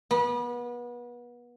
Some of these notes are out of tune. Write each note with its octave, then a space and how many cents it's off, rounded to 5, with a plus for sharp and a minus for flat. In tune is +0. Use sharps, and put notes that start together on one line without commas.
B3 -30